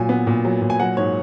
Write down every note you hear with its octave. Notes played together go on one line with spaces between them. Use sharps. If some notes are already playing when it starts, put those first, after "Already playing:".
Already playing: A#2 F#3 G#5
B3
A#2
F#3
A#2
G#5
F#3 F#5
G#2 C#5